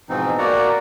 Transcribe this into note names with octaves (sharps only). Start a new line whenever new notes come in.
G#2 B2 E3 F3 C4 D#4
A#3 F#4 D5 F#5 A#5